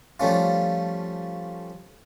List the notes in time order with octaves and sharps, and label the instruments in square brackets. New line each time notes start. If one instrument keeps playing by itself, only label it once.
[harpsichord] F3 G3 A3 C#4 F4